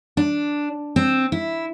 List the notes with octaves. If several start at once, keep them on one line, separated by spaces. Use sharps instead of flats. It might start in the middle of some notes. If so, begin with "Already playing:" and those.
D4
C4
E4